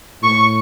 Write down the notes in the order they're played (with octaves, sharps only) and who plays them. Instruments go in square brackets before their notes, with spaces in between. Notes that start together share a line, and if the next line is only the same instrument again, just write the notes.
[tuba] A2 [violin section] C#6